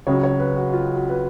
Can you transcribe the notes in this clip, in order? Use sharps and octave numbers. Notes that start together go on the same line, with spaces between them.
C#2 C#3 F#3 C#5
C#5
B4
F#4
F4
F#4
B4